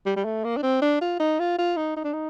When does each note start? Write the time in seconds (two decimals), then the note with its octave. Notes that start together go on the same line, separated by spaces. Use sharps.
0.06 G3
0.16 G3
0.25 A3
0.44 A#3
0.57 D4
0.63 C4
0.82 D4
1.01 F4
1.20 D#4
1.39 F4
1.58 F4
1.77 D#4
1.96 D#4
2.04 D4
2.13 D#4